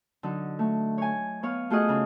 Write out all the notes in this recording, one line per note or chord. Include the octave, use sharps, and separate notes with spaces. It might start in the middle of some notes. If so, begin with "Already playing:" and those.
D3 F#3 D#4
A3
C#5 G#5
B3 C#5 F5
A3 F4 F#4 G#4 D#5 F#5
C#3